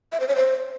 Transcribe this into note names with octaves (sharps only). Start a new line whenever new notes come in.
E5
C5
C#5
C5